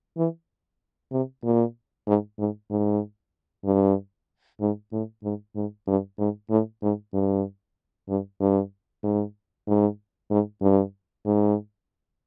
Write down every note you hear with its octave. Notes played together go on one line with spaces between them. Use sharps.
E3
C3
A#2
G#2
G#2
G#2
G2
G#2
A2
G#2
G#2
G2
G#2
A2
G#2
G2
G2
G2
G#2
G#2
G#2
G2
G#2